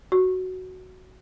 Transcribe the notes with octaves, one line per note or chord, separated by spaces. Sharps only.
F#4